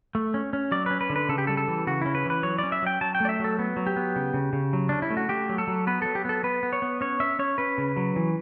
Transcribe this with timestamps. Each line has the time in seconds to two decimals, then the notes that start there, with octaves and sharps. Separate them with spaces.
0.15 A3
0.34 C#4
0.53 C#4
0.72 F#3 D5
0.86 C#4 B4
1.01 B4
1.10 D3
1.16 B4
1.29 C#3 A4
1.38 G4
1.47 G3 A4
1.57 A4
1.68 E3
1.87 C#3 F#4
2.01 C#4 E4
2.15 B4
2.25 E3 B4
2.43 F#3 C#5
2.59 C#4 D5
2.72 E5
2.82 F#3 G5
3.01 F#3 A5
3.15 G5
3.20 A3 D5
3.29 E5
3.40 F#3 A4
3.59 B3
3.77 F#3
3.87 G4
3.96 B3
4.16 C#3
4.34 C#3
4.53 C#3
4.73 F#3
4.89 C#4 D4
5.02 E4
5.10 A3
5.17 F#4
5.29 A3 G4
5.49 F#3
5.58 A4
5.67 F#3
5.87 B3 B4
6.02 F#3 A4
6.15 G4
6.25 B3 A4
6.43 B3 B4
6.63 B3
6.73 C#5
6.82 B3
7.01 C#4 C#5
7.20 C#4 E5
7.39 C#4 C#5
7.58 C#4 B4
7.78 C#3
7.97 F#3
8.16 E3